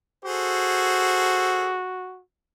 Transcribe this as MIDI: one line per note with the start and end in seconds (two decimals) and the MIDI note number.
0.25 2.21 66
0.25 1.79 68
0.25 1.79 69
0.25 1.79 72